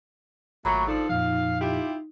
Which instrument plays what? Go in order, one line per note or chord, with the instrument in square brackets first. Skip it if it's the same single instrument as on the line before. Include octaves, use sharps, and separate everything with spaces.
[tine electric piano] G#1 [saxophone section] A#2 F#3 A3 [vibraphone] A#5 B5 C#6
[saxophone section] F3 D4 A4 [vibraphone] D#4
[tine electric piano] F2 A#2 F3 [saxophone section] F5
[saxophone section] E4 F4 G4